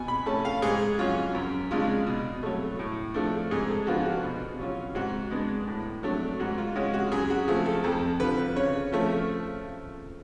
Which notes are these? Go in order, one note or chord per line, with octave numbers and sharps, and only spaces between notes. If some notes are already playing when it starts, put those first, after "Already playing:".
Already playing: B2 G#5
B5
A3 C#4 A5
F5
G#2 G#4
F#3 C#4 F4
F#2
C#3 G#3 D4 F4
B2
F#3 A3
A2
F3 A3 D4
G#2 G#4
A4
F3 B3 D4 F4 F#4
F#4
B2
F#3 C#4 F4
G#2 F#4
G#3 B3 D4
A2
F#3 A3 D4
G#2 F#4
F4
G#3 C#4 F4 F#4
F#4
F#2 G#4
F#4
F3 A3 G#4
A4
F2 A4
D3 F3 B4
C#3 C#5
F3 A3 C#4